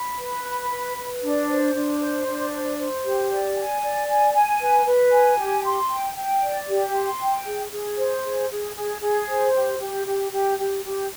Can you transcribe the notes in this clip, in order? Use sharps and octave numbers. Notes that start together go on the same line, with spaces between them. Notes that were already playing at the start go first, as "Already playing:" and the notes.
Already playing: B5
B4
B5
B4
B4
D4
C5
D4
C5
D4
C5
C5
G4
D5
G#5
D5
G#5
G#5
B4
B4
G#5
G4
C6
G5
G5
D5
G4
C6
G5
G#4
G#4
C5
G#4
G#4
G#4
G#4
C5
G4
G4
G4
G4
G4
G4